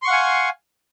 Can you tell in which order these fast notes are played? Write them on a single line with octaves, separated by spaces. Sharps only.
C6 C#6 F#5 F5 G#5